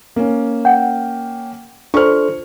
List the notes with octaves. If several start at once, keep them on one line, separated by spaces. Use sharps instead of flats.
A#3 C#4
F#5 G5
D4 F4 A4 C5 C#6 F6